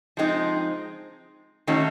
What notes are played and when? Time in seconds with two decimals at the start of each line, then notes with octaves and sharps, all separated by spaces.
0.17 F3 G#3 C4 D#4
1.67 D#3 F#3 A3 C#4